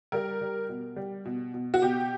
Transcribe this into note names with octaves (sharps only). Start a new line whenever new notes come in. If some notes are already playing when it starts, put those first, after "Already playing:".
G3 A#4
G3
B2
G3
B2
B2
F#4
B2 G4